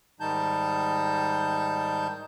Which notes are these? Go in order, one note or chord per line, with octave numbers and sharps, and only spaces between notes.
G#2 D#3 G3 D#4 A5 G6